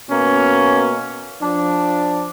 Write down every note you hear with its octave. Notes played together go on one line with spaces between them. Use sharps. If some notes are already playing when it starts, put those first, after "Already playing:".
B2 A#3 C#4
F3 D4